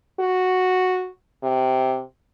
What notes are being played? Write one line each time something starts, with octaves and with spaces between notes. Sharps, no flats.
F#4
C3